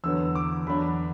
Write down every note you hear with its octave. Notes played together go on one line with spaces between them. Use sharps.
E2 D3 F#3 B3 E6
D6
E2 D3 F#3 D4 B5